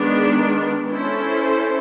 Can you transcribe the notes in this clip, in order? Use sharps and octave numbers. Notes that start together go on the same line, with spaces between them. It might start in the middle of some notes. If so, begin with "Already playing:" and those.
Already playing: D#3 G#3 B3 D4
C#4 E4 A4 C5